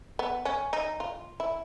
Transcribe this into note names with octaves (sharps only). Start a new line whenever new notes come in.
B3
C#4
D#4
F4
E4